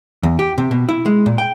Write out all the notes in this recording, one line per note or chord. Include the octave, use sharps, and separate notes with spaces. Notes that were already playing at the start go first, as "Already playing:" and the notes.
E2
G4
C3
B2
E4
G#3
A#2
G5